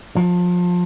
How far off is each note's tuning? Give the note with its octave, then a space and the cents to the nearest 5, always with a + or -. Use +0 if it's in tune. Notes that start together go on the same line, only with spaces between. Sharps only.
F3 +25